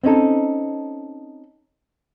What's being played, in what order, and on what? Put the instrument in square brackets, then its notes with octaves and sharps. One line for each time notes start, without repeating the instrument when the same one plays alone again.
[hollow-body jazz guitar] C4 C#4 D#4 A4